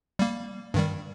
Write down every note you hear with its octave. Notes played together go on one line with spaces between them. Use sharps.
G3 A#3
G2 D#3 G3